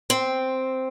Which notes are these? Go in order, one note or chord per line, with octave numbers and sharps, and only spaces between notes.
C4